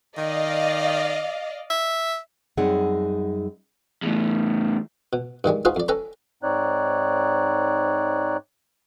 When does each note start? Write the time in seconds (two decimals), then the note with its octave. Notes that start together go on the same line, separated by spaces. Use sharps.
0.17 D#3 D5 D#5 F5
1.70 E5
2.57 F#2 G3 C4 D#4 G#4 F#5
4.02 E2 A2
5.13 B2
5.44 G2 D#3 G3 G#3
5.65 D#4 F4 F#4 G#4 B4 C5
5.76 F2 D5
5.88 C#4 A4 B4 G5 A#5 B5
6.43 G#2 C4 D#4 C#5 D5 F#6